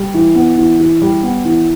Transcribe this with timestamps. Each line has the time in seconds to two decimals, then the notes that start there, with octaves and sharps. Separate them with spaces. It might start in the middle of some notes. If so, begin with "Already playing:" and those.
Already playing: G3
0.14 E3
0.35 B3
0.58 E3
0.80 E3
1.02 G3
1.23 B3
1.45 E3